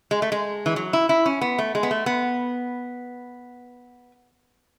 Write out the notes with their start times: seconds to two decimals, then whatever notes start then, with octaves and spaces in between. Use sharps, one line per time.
0.11 G#3
0.22 A3
0.32 G#3
0.66 E3
0.76 F#3
0.93 E4
1.09 E4
1.26 C#4
1.41 B3
1.59 A3
1.75 G#3
1.83 B3
1.91 A3
2.06 B3